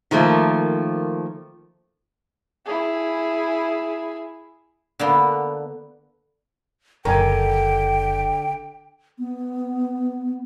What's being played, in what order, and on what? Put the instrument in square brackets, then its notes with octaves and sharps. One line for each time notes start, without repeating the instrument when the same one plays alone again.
[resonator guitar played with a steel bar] D#3 F3 A3 A#3 C5
[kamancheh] E4 G#4
[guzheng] D3 A#3 B3
[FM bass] F#1 [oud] D3 [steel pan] A#4 G#5 [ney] G5
[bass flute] B3